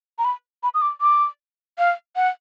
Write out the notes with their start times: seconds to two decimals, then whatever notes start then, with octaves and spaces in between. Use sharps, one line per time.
0.18 A#5
0.25 B5
0.63 B5
0.74 D#6
0.82 D6
1.01 D6
1.78 F5
2.16 F#5